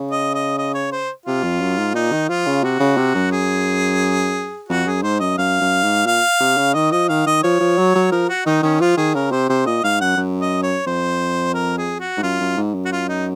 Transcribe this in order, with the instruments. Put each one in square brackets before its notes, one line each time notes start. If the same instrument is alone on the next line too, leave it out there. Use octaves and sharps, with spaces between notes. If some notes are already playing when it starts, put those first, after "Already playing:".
Already playing: [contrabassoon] C#3
[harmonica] D#5
D#5
D#5
C#5
C5
[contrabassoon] C3 [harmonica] F4
[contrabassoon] F2
F#2
G#2
[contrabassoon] A#2 [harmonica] D#4
[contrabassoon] D#3
[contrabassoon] F3 [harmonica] F4
[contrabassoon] C#3
[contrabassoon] C3 [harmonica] F#4
[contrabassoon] C#3
C3
F#2
[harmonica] G#4
[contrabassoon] F2 [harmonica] F#4
[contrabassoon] F#2 [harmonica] G#4
[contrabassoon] G#2 [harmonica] C5
[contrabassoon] F#2 [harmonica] D#5
[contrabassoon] F#2 [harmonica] F5
[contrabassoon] F#2
G#2
[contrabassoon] A#2 [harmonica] F5
[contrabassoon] C3
C#3
[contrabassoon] D#3 [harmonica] D#5
[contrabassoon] F3 [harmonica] D#5
[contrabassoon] D#3 [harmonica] F5
[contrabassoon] D#3 [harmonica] D#5
[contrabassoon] F3 [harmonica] C#5
[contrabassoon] F3
F#3
F#3
[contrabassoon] F3 [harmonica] A#4
[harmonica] F#4
[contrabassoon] D#3 [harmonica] D#4
[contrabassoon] D#3 [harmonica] C#4
[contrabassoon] F3 [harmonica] F4
[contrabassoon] D#3 [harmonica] G#4
[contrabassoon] C#3 [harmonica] A#4
[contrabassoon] C3 [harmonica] C5
[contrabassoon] C3 [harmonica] C5
[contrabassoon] A#2 [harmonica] D#5
[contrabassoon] G#2 [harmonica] F5
[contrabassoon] F#2 [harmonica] F#5
[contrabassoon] F#2
[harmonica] D#5
C#5
[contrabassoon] F2 [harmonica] C5
[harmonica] A#4
G#4
F#4
[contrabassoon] G#2
[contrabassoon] F#2 [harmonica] F4
[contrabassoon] F#2
G#2
F#2
[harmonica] F#4
F4
D#4